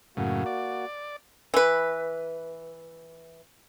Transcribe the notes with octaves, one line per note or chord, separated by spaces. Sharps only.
F#2 A2 C#3 A#3 F#4
D5
E3 B4